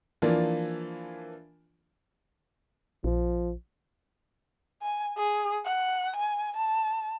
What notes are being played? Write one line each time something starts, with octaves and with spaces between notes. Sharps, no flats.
E3 F3 A#3 D4 F4
A#1 F3
G#5
G#4
F#5
G#5
A5